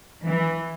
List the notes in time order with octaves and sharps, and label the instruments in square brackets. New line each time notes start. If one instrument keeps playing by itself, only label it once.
[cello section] E3